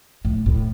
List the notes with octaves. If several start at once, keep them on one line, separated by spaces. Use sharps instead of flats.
A2
A2